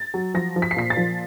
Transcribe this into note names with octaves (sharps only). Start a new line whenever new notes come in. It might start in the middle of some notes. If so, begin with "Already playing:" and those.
Already playing: A6
F#3
F3 A#6
F3
B6
C7
A#2 B6
A6
F3